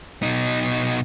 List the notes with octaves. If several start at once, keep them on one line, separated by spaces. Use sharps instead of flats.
B2 D#4